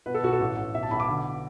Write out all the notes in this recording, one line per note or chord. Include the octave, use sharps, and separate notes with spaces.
B2 B4
A4
B1 F#4
A4
A1
A1
B1 E5
A5
B1 B5
D6
D3